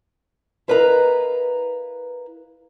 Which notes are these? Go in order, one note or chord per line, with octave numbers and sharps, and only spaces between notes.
E4 A#4 B4 D#5 F5 A#5